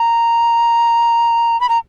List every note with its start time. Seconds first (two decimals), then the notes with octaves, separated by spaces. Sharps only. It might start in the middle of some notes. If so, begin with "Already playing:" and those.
Already playing: A#5
1.61 B5
1.69 A#5